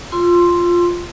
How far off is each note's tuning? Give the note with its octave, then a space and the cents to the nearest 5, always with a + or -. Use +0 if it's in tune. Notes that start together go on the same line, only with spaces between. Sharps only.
F4 +0 C6 +0 E6 +35